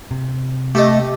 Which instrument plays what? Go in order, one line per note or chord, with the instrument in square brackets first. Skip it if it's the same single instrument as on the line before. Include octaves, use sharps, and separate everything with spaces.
[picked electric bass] C3
[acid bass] A3 [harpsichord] G4 A4 D#5